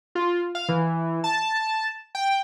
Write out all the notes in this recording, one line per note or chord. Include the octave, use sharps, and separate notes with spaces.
F4
F5
E3
A5
G5